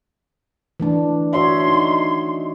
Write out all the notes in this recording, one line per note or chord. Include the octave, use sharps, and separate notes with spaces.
E3 A3 D4
F#4 C#5 E5 C6
D#4